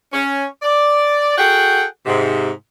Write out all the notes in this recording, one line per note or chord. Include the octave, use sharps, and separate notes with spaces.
C#4
D5
F#4 G#4 A4 F#5 G5
G#2 C3